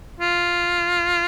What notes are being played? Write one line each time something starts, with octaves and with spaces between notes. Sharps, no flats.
F4